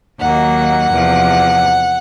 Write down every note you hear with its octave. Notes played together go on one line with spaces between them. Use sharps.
D#2 D#3 F#3 A#3 F#5
E2 C3 F3